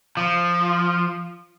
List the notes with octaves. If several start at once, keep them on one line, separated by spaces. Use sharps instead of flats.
F3